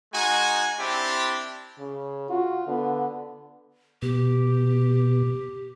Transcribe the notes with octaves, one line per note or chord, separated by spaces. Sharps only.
G#3 D#4 F#4 G#5
C4 D4 E4 G4
C#3
F4 F#4
D3 B3
B2 G4